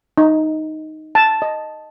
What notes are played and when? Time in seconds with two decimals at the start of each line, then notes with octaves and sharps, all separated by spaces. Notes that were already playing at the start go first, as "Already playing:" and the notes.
0.18 D#4
1.15 A5
1.42 D#5